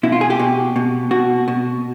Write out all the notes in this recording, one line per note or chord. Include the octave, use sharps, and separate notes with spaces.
B2 E4
F4
G#4
G4
B2
B2
B2 F#4
B2